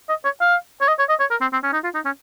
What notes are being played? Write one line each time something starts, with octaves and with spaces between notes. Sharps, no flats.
D#5
C#5
F5
C#5
D#5
C#5
D#5
C#5
A#4
C4
C4
C#4
D#4
F4
D#4
C#4